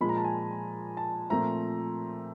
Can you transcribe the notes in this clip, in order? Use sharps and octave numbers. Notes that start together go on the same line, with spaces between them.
A#2 F3 G#3 B5
A#5
A5
G#5
A5
A#2 F3 A3 C4 A#5